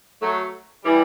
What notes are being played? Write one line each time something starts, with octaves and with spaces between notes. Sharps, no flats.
F#3 A3
E3 G3